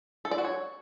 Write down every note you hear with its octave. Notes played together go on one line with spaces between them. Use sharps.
A4
D5
F#4
C#5